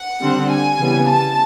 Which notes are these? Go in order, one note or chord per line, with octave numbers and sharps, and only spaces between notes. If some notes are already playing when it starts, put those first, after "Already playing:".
Already playing: F#5
D3 G3 C4
G#5
C#3 E3 G3 B3
A5